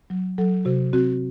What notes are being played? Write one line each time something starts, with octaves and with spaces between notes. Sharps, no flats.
F#3
F#3 A4
C3 F#4
C4 F#4